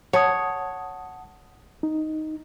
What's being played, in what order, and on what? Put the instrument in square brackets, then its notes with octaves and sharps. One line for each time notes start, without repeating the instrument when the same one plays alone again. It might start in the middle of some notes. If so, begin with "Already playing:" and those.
[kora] C#5 [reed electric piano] F#5 A5 D#6
[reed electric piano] D#4